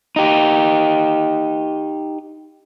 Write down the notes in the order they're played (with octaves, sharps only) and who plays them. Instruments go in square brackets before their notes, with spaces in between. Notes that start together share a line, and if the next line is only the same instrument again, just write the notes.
[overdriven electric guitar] D#4 G4